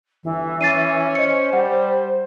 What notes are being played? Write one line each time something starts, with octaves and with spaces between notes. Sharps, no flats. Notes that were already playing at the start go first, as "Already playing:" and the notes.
G1 E3
C#4 A6 C7 D#7
C5 D#5 C#7
G3 F#5